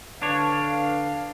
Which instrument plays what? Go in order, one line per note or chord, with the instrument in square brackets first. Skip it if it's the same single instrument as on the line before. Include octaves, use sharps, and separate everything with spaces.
[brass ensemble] D3 B4 F5 [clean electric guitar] D4 C#5